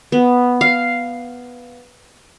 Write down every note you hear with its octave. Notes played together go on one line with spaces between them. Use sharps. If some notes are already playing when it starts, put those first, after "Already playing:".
B3
F5